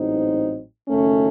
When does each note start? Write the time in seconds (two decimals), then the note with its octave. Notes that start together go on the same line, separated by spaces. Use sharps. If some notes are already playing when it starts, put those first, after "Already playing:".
Already playing: A1 G#2 F#3 C4 D#4
0.88 F#1 F#2 D#3 A3 C#4